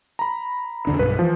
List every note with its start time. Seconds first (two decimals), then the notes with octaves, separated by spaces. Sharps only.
0.19 A#5 B5
0.87 E2 D3 D4
0.99 B1 G2 B4
1.19 E3 F3